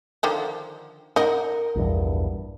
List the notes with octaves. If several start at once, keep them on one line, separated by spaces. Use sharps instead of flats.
D3 D#3 F3
D#4 A#4 D#5 F#5
A#1 E2 G2